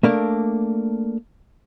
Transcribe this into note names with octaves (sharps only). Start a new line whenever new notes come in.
A3 A#3 D4